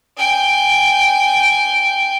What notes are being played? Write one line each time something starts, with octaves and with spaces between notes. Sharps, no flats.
G5 G#5